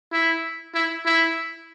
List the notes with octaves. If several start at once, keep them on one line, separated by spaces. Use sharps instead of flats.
E4
E4
E4